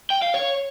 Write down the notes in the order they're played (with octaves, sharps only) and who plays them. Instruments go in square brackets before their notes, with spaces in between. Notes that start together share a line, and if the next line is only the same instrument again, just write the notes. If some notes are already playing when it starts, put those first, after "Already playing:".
[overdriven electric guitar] G5
F5
C#5